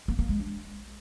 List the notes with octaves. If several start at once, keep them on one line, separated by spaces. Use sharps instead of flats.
A#3
A#3
G#3
D4